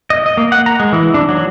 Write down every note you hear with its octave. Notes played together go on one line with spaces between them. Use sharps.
D#5
D#5
A#3
F#5
A#5
G#3
E3
D4
F#3